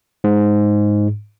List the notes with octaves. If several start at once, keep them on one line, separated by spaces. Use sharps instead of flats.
G#2